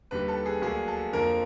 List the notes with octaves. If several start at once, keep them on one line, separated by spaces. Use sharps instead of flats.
D#2 D3 G3 B4
A4
G#4
D2 D3 F#3 A#3 G#4
A4
F2 D3 F3 A#3 A#4